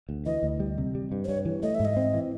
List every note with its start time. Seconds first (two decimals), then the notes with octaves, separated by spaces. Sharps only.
0.09 D2
0.26 E3 D#5
0.43 D2
0.60 G3
0.78 C3
0.95 G3
1.12 G2
1.24 C5
1.28 G2 C#5
1.45 E3
1.63 A3 D#5
1.75 G#2 E5
1.85 D#5
1.97 C4
2.14 E3